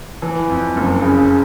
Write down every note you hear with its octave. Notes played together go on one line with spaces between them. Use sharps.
E3
F2
F#1
C#3